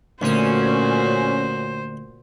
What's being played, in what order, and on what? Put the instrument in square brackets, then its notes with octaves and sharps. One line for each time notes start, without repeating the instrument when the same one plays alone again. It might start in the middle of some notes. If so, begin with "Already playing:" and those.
[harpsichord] D2 D#6 [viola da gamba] A#2 F#4 [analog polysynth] C#4 [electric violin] C5